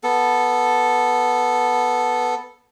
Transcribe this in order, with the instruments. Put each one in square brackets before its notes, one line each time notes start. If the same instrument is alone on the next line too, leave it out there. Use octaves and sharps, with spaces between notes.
[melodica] B3 A4